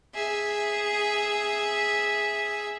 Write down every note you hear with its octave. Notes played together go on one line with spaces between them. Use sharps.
G#4 E5